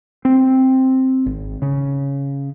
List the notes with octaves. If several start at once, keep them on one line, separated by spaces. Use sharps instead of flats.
C4
G#1
C#3